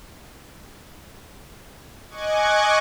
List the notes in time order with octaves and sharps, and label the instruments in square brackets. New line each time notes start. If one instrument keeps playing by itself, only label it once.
[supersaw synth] D#5 G#5 C#6 D6 F#6 G#6